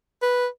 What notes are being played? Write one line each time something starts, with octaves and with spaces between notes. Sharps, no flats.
B4